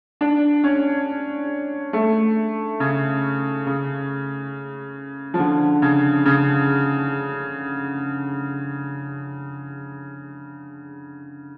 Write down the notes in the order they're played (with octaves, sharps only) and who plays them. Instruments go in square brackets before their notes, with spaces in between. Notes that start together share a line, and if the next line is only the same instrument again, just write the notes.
[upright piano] D4
C#4
A3
C#3
C#3
F3
D3
C#3
C#3